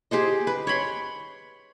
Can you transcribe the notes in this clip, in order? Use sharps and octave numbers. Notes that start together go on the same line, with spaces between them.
G4 G#4 C5 D#5
B4
C#5 G5 B5 C6